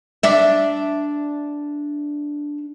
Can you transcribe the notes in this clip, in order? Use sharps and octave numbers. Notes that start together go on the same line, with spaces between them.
D4 E5